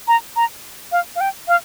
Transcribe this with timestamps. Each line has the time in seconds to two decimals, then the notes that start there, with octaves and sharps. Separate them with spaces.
0.08 A#5
0.36 A#5
0.92 F5
1.16 F5
1.21 G5
1.48 F5